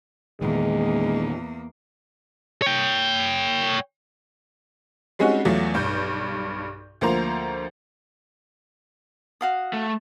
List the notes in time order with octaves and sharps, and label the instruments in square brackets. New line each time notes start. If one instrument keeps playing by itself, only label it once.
[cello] E2 A#3 [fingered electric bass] A#2 D#3 [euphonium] G#3
[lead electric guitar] C#5 G5
[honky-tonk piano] G3 G#3 C4 C#4 D#4 F#4
E2 F#3 A3 F4
B1 G2 G6
D2 F3 A#3 C5 A#5
[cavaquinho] F#4 F5 D#6
[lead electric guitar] A3